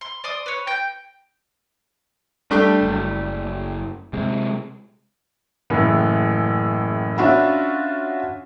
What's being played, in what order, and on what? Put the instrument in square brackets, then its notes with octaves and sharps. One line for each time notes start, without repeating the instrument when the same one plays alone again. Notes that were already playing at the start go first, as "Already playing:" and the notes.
[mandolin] C6
D5 C6 D#6
B4 C#5
[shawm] G5 [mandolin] G6
[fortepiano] G3 A3 G4 [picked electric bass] D4
[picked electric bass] F#1
C3 G#3
[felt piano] F#1 A2 C#3 E3
C#4 D4 F4 F#4 E5 B5